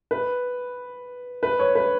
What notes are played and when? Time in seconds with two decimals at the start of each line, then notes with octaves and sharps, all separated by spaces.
0.11 B4
1.43 B4
1.60 C#5
1.75 B4